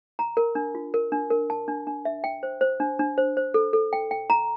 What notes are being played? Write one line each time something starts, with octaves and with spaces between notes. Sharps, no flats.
A#5
A#4
D4
F4
A#4
D4
A#4
A5
D4
D4
E5
G5
C5
C5
D4
D4
C5
C5
A4
A4
G5
G5
A#5